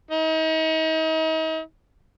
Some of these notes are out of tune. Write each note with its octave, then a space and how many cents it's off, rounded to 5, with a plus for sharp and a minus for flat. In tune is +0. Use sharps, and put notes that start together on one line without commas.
D#4 +40